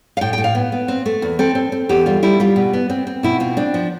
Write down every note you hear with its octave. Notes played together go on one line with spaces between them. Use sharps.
F5
A2 G5
A2 G5
F5
B3
B3
C4
A3
E2
C4 A4
C4
C4
E2 G4
G3 F4
G3 E4
G3 F4
B2
B3
C4
C4
B2 E4
C4 F4
C4 D4
F3